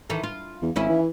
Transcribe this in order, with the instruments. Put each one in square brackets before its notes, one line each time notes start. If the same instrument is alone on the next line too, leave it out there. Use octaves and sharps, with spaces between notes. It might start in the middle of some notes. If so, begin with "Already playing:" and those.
[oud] D#3 E3 A4
F4
[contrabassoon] E2
[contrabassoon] G#1 [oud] D#2 C#4 E4
[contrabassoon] E3